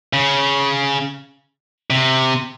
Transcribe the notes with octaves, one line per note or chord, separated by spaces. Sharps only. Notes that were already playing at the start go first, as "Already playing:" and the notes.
C#3
C3